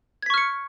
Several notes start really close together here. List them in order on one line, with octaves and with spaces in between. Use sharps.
G#6 B6 C#6 F6 C#7